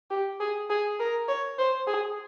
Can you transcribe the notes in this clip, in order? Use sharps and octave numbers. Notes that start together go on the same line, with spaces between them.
G4
G#4
G#4
A#4
C#5
C5
G#4